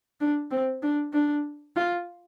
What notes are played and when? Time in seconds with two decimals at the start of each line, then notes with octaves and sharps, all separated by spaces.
0.20 D4
0.51 C4
0.82 D4
1.13 D4
1.76 F4